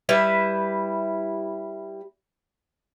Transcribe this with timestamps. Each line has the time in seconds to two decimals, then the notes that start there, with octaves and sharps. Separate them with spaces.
0.09 G3 E4 B4 E5